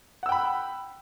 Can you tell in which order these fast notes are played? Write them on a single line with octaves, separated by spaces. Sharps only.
F#5 E6 G5 B5